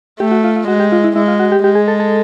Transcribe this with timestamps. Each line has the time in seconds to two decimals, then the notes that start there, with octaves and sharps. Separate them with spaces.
0.20 A3 G4
0.32 F#4
0.44 F4
0.56 F4
0.68 G#3 F#4
0.80 G4
0.92 F4
1.04 E4
1.16 G#3 E4
1.28 F4
1.40 F#4
1.52 G4
1.64 G#3 G4
1.75 G#4
1.88 A4
2.00 A4